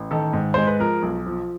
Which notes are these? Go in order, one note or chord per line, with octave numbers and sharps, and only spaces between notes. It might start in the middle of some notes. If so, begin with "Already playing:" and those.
Already playing: A1
D#3 A4
G#2
G#3 C5
B4
F3 A#4
B1
F3